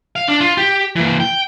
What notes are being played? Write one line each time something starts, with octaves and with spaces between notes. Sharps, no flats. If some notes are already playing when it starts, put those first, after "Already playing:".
F5
D4
F4
G4
E3 A#3
G5